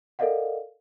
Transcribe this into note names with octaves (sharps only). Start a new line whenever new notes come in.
A4 A#4 D5 D#5 F5 F#5